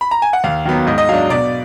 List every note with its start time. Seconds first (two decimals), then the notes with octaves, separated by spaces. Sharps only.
0.01 B5
0.11 A#5
0.22 G#5
0.33 F#5
0.44 D#2 F5
0.65 D#3 F#3 B3
0.87 G#2 D#5
0.98 D#5
1.09 F#3 D4 F5
1.30 B2 D5